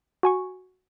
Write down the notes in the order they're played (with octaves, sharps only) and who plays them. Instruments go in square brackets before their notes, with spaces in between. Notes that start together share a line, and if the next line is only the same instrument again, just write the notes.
[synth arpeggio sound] F#4 G#5 C#6